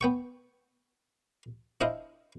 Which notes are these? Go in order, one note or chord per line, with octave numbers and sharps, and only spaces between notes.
B3 G5 C#6
D4 E4 C5 D#5 F5